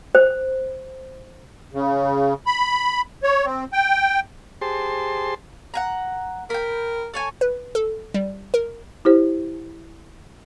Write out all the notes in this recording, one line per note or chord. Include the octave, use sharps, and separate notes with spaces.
C5
C#3
B5
C#5
C4
G5
G4 G#4 C5 A5 C6
F#5 G#5 A#5
A#4 G5 B5
A4 C#5 G#5
B4
A4
G3
A#4
E4 G4 C5